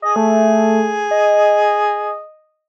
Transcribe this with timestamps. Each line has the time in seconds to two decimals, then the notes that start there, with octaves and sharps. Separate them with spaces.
0.02 G#4 D#5
0.16 A3
1.11 D#5